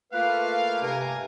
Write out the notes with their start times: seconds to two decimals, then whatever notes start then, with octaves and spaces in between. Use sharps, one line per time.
0.13 A3 A#3 E4 F4 B4 F5
0.82 G2 C3 A#4 G#5